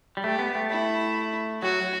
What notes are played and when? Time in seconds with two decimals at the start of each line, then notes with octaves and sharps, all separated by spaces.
0.17 G3
0.24 A3 G4
0.39 B3
0.55 A3
0.70 E4
1.62 F#3 F#4